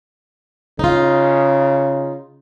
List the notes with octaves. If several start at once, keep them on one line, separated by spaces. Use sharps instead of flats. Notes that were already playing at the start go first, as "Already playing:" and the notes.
C#3 D#4 F4